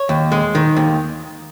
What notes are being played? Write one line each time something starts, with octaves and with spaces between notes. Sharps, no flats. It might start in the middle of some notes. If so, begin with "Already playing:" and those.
Already playing: C#5
D#2
G#3
D#3
D#2